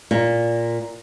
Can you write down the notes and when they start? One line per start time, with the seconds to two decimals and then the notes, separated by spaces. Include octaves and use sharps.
0.11 A#2